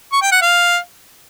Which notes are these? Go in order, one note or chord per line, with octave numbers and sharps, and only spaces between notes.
C#6
G5
F#5
F5